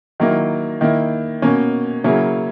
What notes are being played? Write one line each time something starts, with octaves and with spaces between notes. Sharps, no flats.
D#3 F#3 A#3 E4
D#3 A#3 E4
B2 A#3 C#4
C#3 F#3 A#3 C#4 E4